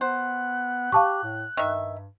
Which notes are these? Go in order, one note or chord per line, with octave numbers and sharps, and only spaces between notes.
B3 C5 F#6
G4 F5 A5 C#6
A2
G2 D#3 E5